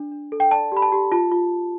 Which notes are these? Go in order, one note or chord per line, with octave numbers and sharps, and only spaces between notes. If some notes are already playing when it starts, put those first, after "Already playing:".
Already playing: D4
D4
A4
G5
D5 A5
G4 B5
A5
G4
F4 A5
F4